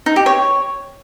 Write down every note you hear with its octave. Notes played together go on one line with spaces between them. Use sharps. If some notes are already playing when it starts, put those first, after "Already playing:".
D#4
G4
C#5